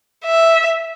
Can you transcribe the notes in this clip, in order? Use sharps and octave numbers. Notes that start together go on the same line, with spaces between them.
E5